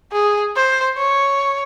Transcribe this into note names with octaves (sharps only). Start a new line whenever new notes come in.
G#4
C5
C#5